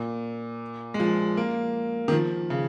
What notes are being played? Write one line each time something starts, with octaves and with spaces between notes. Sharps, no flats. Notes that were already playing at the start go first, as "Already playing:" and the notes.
Already playing: A#2
G#3
F3
A#3
D#3
F3
C#3